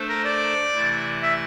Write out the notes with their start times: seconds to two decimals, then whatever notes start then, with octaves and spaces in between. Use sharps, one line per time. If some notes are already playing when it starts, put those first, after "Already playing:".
Already playing: A3 D4 A4 C5
0.09 A#4
0.24 D5
0.74 C3 E3 A3 E4
1.22 E5